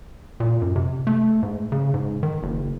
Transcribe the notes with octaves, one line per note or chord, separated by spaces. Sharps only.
A#2
F#2
C3
A3
G#2
C#3
G#2
D#3
F#1